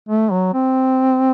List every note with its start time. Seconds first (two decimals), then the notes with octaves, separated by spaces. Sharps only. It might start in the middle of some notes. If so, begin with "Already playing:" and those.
0.09 A3
0.31 F#3
0.54 C4